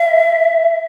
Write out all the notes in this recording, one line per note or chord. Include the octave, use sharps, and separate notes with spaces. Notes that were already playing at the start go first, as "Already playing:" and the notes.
Already playing: E5